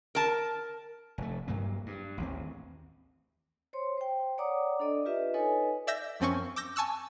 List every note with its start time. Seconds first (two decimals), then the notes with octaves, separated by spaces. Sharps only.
0.15 A#4 A5
1.18 F1 A3
1.48 G2 F#3 A#3
1.86 G2
2.18 A1 D#2 C4
3.73 C5 C#5 C6
3.97 C5 G5
4.38 C#5 D5 F#5 A#5 D6 D#6
4.80 D4 A4 D5 D#5
5.06 F4 G4 B4 D#5 E5
5.34 D#4 A4 B4 C#5 D#5 G#5
5.87 D5 E5 E6 G6 A#6
6.20 F#2 F3 C4 C#4 G#5 C#6
6.56 D6 E6 G6 A#6
6.76 G#5 A5 C#6 E6 F#6